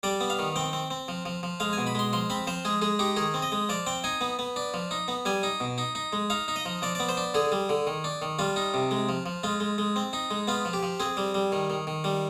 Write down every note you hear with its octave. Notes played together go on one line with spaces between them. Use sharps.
G3 D5
B3
F5
D#3
C4 G5
C4
C4
F3
F3
F3
G#3 F5
B2 G#5
B5
G#3 C6
F3 C6
C4 B5
F3 C5
G#3 G#4
G#3 G#4
D#4 G4
D#3 G#4
C4
D#5
G#3
F3 D5
C4 G5
D#4 G#5
B3
B3
D4
F3
D#4
B3
G3 G#5
D#4
B2
D#4
D#4
G#3
D#4 F5
D#4
D#5
F3
F3 D5
B3 D5
C5
D4
D3 G#4
G3
D3
D#3
D4
D#3
G3 F4
D#4
C3
G#3
F3
F3
G#3 F4
G#3
G#3
C4
D#4
G#3
B3 F4
F3
G4
F3
C4 G#4
G3
G3
D#3
D#3
D#3
G3